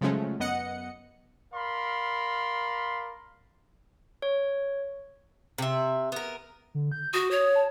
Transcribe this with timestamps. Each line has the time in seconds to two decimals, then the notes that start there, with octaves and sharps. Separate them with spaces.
0.01 C#3 F3 F#3 G#3 A3 C#4
0.40 F#2 B3 D#5 F#5 C#7
1.54 A#4 D5 F5 B5 C6
4.22 C#5
5.58 C3 E5
6.12 B3 A#4
6.74 D3
6.92 G6
7.13 F#4 D#6
7.31 C#5
7.55 A5